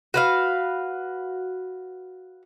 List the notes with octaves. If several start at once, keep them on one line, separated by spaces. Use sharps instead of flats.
F#4 B4 F5